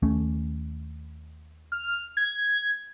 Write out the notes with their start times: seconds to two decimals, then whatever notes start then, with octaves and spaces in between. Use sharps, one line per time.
0.02 D#2 A3 C#4
1.72 F6
2.17 G#6